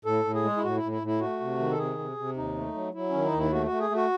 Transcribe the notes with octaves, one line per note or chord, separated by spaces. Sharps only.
A2 A4
A2
G#4
G#3
E4
A2 F#4
E4
A2
E4
A2 E4
A3 F#4
C3
D#3
A4
C3 G#4
C3
C3
D#2 D#4
A3
F#3
F#3 E4
D#3 C#4
D#4
D#2 E4
A3 F#4
F#4
A3
G#4
A3
F#4